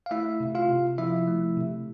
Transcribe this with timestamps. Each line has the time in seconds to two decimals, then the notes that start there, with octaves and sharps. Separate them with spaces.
0.06 F5
0.11 A3 E4 E5
0.40 C3
0.55 F4 F5
0.69 C3
0.98 F3 E4 E5
1.28 A3
1.57 C3